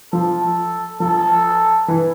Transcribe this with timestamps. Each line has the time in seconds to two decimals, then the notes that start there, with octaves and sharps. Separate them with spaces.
0.13 F3 A4
1.00 F3 A4
1.88 E3